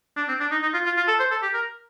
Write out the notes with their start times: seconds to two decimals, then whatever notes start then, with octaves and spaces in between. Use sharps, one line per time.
0.17 D4
0.28 C4
0.40 D4
0.51 D#4
0.62 D#4
0.73 F4
0.86 F4
0.96 F4
1.08 A4
1.19 C5
1.31 A4
1.42 G4
1.54 A#4